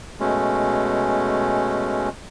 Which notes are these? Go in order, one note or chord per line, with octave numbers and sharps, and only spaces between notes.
B2 G#3 A3 C#4